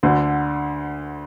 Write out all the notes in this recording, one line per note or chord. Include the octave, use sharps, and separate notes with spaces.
D2 D3